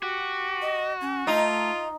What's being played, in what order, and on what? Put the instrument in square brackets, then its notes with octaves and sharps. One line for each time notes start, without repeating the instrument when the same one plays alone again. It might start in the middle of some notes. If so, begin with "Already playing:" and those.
[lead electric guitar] F#4 [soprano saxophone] G4
[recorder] D#5
C#4
[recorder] A3 [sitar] D#4 [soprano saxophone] F4